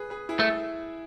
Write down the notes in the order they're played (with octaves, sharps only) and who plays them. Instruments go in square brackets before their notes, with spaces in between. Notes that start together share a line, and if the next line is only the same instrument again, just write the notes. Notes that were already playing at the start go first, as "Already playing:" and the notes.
Already playing: [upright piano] G#4 B4
G#4 B4
E4 G#4
[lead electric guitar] A3 [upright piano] E5